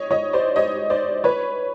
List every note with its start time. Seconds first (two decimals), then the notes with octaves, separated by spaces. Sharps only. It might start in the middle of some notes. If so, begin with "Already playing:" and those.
Already playing: C#5 D#5
0.11 C#5 D#5
0.33 C5 D5
0.56 C#5 D#5
0.90 C5 D5
1.24 B4 C#5